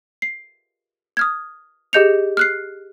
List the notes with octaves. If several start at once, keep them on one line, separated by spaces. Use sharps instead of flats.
C7
D#6 F6 G#6
G4 G#4 D#5 G6 C#7 F7
F6 F#6 C7